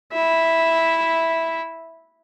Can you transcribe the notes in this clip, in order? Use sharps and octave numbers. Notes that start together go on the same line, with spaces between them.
E4 E5